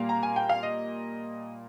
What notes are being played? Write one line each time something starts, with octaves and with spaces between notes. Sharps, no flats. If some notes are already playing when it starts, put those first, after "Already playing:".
Already playing: A#2 G3 A#3 F5
A#5
G#5
G5
F5
D#5